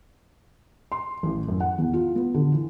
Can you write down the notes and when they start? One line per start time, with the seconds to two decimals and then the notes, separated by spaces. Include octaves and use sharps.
0.92 C6
1.23 A1
1.48 F#2
1.60 F#5
1.78 E2
1.93 F4
2.15 B3
2.34 D3
2.52 E3